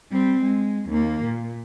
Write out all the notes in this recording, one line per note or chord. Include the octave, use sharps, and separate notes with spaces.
G3 C4
G#3
D#2 A#3
A#2